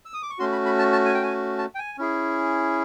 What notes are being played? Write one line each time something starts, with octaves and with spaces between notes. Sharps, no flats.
E6
D#6
D6
C#6
A3 C#4 F#4 C6
B5
B5
A5
A5
G#5
G5
G#5
A5
G5
G#5
C#4 E4 G#4